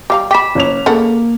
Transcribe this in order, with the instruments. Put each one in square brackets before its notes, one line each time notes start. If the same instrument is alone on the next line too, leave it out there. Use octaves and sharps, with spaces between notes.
[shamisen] G3 F5 A#5 [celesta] D6
[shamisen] G5 B5 [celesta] D6 B6 E7
[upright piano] F#1 C#5 F7
[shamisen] C#3 A4 F#5 [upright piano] A#3